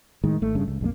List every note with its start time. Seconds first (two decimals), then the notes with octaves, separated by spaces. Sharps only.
0.24 A2 D#3 G#3
0.42 G#1 A3
0.55 G2 C#3
0.68 C#2
0.81 B1 F2 F#3 A#3